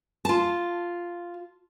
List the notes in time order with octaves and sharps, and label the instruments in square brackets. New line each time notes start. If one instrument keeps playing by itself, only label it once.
[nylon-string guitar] F4 A5